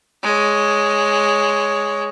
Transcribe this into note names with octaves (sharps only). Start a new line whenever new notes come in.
G#3 C#5